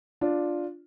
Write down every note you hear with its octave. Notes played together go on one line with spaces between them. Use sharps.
D4 F4